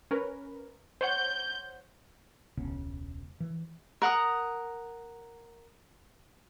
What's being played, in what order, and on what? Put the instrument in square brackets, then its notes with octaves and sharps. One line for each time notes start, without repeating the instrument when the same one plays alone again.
[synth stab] C#4 A#4 B4
[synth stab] C5 C#5 F#5 [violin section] G6
[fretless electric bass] E1 C#2 C#3 B3
E3
[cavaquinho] A#4 F#5 A#5 D#6